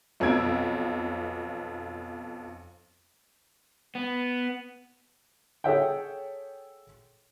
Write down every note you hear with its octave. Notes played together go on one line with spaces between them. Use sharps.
B1 F2 B3 E6 G#6 D7
B3
G#4 A4 C#5 E5 F#5 G5